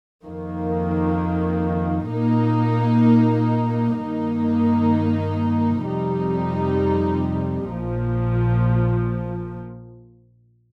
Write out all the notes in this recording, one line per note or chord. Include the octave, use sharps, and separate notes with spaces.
F2 D#3 A#3
A#2 A#3 D#4
G2 D#3 A#3 D#4
F2 C3 G3 D#4
A#1 A#2 F3